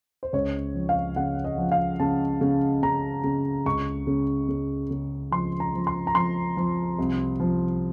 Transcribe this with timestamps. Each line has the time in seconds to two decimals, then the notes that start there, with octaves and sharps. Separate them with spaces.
0.23 C5
0.33 C#2 C#5
0.75 F3
0.89 F5
1.16 C#3 F#5
1.44 D#5
1.58 F3
1.72 F5
2.00 C#3 A5
2.41 C#3
2.83 C#3 A#5
3.24 C#3
3.66 C#2 C#6
4.07 C#3
4.49 C#3
4.91 C#3
5.31 F3 C6
5.60 A#5
5.74 F3
5.87 C6
6.07 A#5
6.15 F3 C6
6.57 F3
6.99 C2
7.40 F3